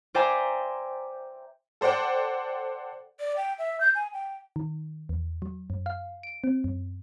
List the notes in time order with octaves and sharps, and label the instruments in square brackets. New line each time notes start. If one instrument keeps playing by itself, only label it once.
[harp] C5 D5 E5 G5 G#5 A#5
[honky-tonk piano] A4 C5 D5 F#5 G5
[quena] D5
G5
E5
G6
G#5
G5
[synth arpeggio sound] D#3
E2
F#3
F#2
F5
D7
C4
F#2